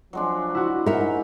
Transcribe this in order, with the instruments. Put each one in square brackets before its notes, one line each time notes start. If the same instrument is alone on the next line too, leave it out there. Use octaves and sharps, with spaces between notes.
[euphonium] F3 [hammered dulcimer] F#3 G#3 D4
[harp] E4 F#4
[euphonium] G#2 [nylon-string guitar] A#4 E5 [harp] G6 C#7